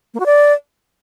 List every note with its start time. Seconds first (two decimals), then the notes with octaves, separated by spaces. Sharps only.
0.14 A#3
0.20 F#4
0.26 D5